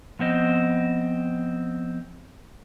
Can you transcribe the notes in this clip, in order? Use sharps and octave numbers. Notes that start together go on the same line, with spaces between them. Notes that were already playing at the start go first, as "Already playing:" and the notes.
F3 B3 C4 D#5